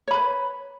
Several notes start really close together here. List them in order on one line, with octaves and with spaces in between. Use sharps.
C#5 B5 B4